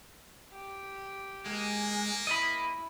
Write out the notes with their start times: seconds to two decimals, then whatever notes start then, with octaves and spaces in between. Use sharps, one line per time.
0.52 G4
1.46 G#3 A#3
2.27 E4 D#5 B5